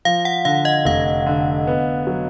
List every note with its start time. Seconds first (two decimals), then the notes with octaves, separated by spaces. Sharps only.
0.05 F3 F5
0.25 F#5
0.45 D3 F5
0.65 D#5
0.85 F1 F5
1.26 D3
1.67 B3
2.07 F#3